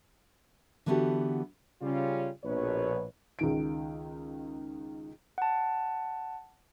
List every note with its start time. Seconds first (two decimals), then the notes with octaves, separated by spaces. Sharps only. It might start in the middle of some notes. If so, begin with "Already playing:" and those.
0.86 D3 E3 B3 F#4 G4 A4
1.82 C#3 G3 C#4 F4
2.44 A#1 B2 B4 C#5
3.39 C#2 D#3 D7
5.38 F#5 A5